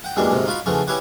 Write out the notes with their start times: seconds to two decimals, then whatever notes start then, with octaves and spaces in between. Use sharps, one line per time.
0.04 F#5 G5
0.17 F#2 E3 G3 G#3 A#3 D4
0.31 D2 G#2 C3 D#3
0.46 D#4 F4 F#4 B5
0.66 C#3 E3 F3 A3 F#4
0.87 C#4 E4 G4 B4 C#5 F#5